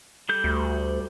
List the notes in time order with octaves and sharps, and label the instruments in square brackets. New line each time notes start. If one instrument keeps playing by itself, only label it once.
[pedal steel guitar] G3 A4 G6
[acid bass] D2